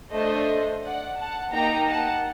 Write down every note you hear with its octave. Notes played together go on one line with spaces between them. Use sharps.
A3 D4 A4 C5 D#5
D5 F#5
F#5 A5
A#3 D#4 G4 G5 A#5
F#5 A5